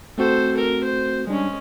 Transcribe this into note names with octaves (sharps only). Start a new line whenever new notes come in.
A3 C4 F#4 A4 C5
A4 A#4
C5
G3 G#3 C#4 D4